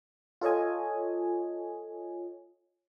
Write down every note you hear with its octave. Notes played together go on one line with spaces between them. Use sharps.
F4 A4 C#5 D#5 G#5